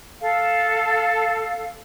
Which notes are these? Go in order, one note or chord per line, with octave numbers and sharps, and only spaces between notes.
A4 F5